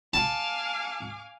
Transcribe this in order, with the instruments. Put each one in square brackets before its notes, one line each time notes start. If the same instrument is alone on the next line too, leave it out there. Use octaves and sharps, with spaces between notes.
[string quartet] F5 G#5 D6 [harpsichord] A5